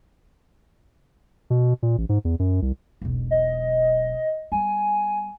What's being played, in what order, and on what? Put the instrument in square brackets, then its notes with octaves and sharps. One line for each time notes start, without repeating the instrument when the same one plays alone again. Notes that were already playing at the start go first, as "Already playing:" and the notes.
[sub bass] B2
A#2
A1
G#2
E2
F#2
C2
[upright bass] E1 B1
[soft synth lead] D#5
[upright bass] G3 B3 [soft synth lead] G#5